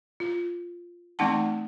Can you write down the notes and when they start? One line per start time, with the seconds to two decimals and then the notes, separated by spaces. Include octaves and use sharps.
0.20 F4
1.19 E3 A3 C4 D#4 F#5 A5